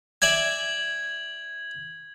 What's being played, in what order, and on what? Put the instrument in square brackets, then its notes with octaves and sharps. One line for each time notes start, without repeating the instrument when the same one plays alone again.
[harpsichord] D5 E5 G#5 [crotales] G#6 F#7